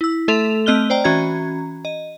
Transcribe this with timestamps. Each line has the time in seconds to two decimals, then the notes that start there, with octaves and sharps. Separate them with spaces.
0.01 E4 E6
0.28 A3 A4 E5 C6 F7
0.66 A3 C4 D#5 F6 F#6 G7
0.90 C5 D5 G5 A#5
1.04 E3 C#4 F#4 A#5 G#6
1.85 D#5